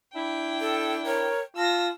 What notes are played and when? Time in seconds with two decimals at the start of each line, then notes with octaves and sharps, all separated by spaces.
0.15 D4 E4 G5
0.61 A4
1.06 A#4 C#5
1.57 F4 A5 E6 A#6